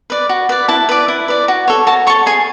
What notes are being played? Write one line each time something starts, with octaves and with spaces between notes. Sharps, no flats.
B4 D5
F#4
B4 D5
E4 A5
B4 D5
E4
B4 D5
F#4
A4 C#5
F#4 A5
A4 C#5 C#6
G#4 G#5